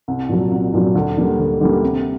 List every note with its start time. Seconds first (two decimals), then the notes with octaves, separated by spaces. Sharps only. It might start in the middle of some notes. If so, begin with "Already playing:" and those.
0.08 C2
0.29 A#2 F#3
0.51 C2
0.74 A#2 F#3
0.95 D2
1.17 D3 G3 A#3
1.39 D2
1.60 D3 G3 A#3
1.83 C3